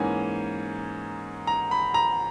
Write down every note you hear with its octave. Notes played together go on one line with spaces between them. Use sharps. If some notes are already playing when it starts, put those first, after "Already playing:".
Already playing: G#2 E3 A#3 C#4 G#5
A#5
B5
A#5